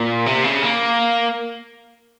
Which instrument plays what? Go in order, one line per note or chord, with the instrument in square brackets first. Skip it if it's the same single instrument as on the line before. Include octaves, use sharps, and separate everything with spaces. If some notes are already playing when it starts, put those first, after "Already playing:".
Already playing: [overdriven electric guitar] A#2
C3
C#3
A#3